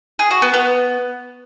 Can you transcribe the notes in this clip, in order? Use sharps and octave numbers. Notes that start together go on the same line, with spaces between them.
G#4
F#4
B3
B3